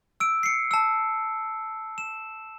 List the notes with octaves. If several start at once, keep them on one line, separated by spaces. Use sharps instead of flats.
E6 D7
C7 C#7
A5 E6
E7